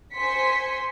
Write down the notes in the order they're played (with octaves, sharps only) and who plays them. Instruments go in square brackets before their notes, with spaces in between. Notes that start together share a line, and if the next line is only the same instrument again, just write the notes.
[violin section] C5 G#5 C6 B6 C#7